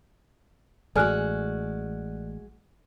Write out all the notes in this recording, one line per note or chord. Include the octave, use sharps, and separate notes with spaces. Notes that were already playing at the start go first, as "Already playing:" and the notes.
A1 G#3 F#4 A4 D5 G#5 F6 F#6